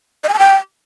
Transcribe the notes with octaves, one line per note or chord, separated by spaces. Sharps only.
D#5
G#5
A5
G5